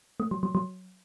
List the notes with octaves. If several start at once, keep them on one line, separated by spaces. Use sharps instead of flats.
A3
F#3
F#3
F#3